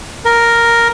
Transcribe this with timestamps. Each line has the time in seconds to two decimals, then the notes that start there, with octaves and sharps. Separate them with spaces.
0.25 A#4